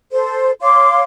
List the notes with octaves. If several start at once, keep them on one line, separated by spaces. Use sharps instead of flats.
A4 C5
C#5 F5 C6 D6